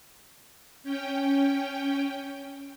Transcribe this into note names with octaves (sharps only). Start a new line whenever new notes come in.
C#4 G5